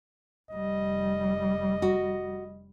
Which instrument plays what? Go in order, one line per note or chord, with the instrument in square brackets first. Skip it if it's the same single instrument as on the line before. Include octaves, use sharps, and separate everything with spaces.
[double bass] F1 G3 [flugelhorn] D#5
[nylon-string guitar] F#4